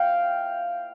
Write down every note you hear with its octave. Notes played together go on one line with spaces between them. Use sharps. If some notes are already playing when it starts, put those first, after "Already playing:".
Already playing: F5 G5